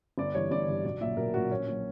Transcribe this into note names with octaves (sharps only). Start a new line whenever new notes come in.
G1 D5
G2 E3 C#5
G1 D5
G2 E3
B1 D5
A#2 F#3 E5
B1 A#4
A#2 F#3 F#4
A#1 C#4
A#2 F#3